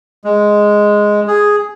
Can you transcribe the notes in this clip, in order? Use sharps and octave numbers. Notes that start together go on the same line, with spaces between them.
G#3
G#4